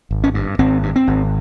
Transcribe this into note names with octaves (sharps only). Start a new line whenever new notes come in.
G#1
C#4
G2
G#1 C4
G2
C4
G#1